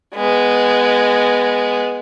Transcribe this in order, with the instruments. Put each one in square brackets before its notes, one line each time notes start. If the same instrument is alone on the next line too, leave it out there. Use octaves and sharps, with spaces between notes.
[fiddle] G#3 B3